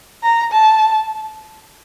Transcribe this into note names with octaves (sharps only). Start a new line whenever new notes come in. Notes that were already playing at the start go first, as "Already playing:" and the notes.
A#5
A5